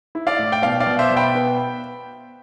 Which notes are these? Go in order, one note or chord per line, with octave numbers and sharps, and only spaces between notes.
E4
D5 F5
A2
G5
B2 D5 F5
D5 F5
B2
C5 E5
B2
G5 B5
B3